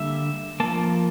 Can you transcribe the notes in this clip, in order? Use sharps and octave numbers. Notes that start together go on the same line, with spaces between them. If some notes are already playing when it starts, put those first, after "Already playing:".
Already playing: D3 G3 A#3 E5
F3 A#3 A5